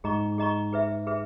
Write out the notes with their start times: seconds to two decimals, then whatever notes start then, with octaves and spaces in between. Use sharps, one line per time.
0.04 G#2 G#4 D#5 A#5 C#6
0.38 G#4 D#5 A#5 C#6
0.73 G#4 B4 E5
1.07 G#4 B4 E5